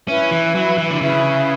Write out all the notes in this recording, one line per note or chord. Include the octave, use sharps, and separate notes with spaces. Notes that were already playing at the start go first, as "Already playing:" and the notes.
C#4 E4 B4 E5
E3
F#3
E3
D3
C#3 E4 B4 E5